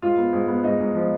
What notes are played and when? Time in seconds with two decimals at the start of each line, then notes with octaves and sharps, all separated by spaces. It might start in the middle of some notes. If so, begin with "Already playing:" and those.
0.02 G#2 F4
0.18 B3
0.33 G#2
0.48 B3
0.64 G#2 D#4
0.80 G#2
0.95 F3